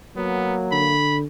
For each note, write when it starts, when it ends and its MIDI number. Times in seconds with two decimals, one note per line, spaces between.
0.16 0.94 54
0.16 0.94 58
0.16 0.56 59
0.72 1.26 50
0.72 1.18 83